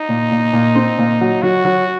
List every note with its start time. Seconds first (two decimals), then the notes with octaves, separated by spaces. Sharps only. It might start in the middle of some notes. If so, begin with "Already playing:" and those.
Already playing: D#4
0.09 A#2
0.32 A#2
0.53 A#2
0.75 C4
0.98 A#2
1.21 F#3
1.42 F#3 F#4
1.65 F#3